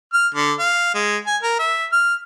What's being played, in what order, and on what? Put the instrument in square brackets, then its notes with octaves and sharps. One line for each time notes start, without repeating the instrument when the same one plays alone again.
[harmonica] F6
D3
F5
G#3
G#5
A#4
E5
F6